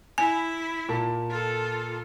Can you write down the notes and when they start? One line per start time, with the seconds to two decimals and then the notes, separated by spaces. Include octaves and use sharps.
0.18 E4 G#5 B5
0.89 A#2 A#3 A5
1.29 F4 A4